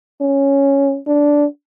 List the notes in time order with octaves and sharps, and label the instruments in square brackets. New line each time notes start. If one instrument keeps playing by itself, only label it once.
[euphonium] C#4
D4